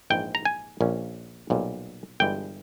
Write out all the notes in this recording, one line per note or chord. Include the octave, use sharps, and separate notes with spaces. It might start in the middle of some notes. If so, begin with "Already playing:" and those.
A#1 G#2 E3 G5
A#5
G#5
A#1 A#2 A#3 C#4
B1 A#2 G3
G1 G2 E3 G#3 G5